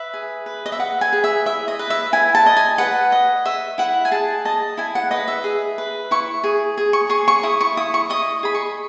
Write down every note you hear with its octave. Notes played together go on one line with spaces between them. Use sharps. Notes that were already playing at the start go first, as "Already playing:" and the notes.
Already playing: B4 E5
G#4
B4
D#5
E5
B4 F#5
G#5
G#4
E5
E4 E5
D#5
B4
E5
E4 G#5
A5
D#5
G#5
B4 F#5
D#5
D#5 E5
E4 F#5
G#5
G#4 A5
D#5 A5
E4 G#5
F#5
B4 D#5
E5
G#4
B4
E4 C#6
G#4
G#4
C#6
G#4 C#6
C#6
E4 D#6
C#6
E4 D#6
C#6
D#5 D#6
G#4 B5
C#6